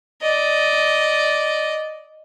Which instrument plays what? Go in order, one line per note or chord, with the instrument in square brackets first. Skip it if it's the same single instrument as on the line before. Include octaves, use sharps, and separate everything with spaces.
[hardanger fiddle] D5 D#5